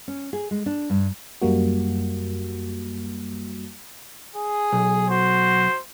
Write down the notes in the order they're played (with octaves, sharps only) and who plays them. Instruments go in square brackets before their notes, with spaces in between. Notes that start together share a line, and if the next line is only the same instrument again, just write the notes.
[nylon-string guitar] C#4
G#4
G#3
D4
G2
[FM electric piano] F#2 G3 A#3 F#4
[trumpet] G#4
[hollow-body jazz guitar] B1
[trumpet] F#4 [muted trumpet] C5